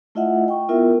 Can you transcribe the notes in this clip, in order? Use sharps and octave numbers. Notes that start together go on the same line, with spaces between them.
A3 E4 F4 D#5 E5 F#5
G5 C#6
B3 E4 F4 A#4 E5 G5